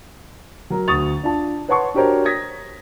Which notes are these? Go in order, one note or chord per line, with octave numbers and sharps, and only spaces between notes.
F#3 A#4
D2 F#4 C#6 D#6 A6 F7
D4 F4 A5
B4 C#5 F#5 A5 C6 C#6
D4 F#4 G4 A#4 C5 C#5
D#6 G#6 A#6 B6